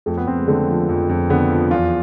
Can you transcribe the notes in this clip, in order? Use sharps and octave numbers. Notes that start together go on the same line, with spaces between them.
F2 A3
B3
F2 C4
G#3
D3 A3
F3
F2
F2
D3 B3
F3
E2 F4